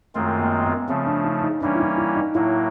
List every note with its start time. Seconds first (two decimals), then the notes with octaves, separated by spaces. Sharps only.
0.15 F#2 D#3 G#3 A3 C4 F4
0.40 A#3
0.65 B3
0.88 C#3 F3 A3 C4
1.07 D4
1.25 D#4
1.44 D#4
1.61 E3 G3 A#3 C#4 D4
1.75 E4
1.80 D#4
1.98 E4
2.16 D#4
2.35 A2 F#3 A#3 E4